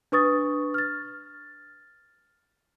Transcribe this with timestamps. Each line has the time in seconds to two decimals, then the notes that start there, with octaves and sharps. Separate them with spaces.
0.12 D4 B4 C#6 D#6 A6
0.74 F6 A6